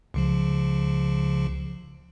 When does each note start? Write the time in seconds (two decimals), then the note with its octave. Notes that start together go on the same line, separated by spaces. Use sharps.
0.14 C#2 C#3 F3